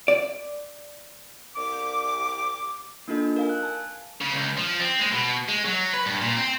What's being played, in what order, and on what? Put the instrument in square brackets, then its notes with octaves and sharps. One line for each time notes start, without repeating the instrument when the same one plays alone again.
[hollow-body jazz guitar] D5
[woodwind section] C2 D6
[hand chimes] A#3 D4 D#4 F4 A4 D#5
A#4 F5 G#5
F#6
G#5 A5
[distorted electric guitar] C#3
C#2
F3
C4
G#3
B2
G#3
F#3
B4
G2
A#2
C4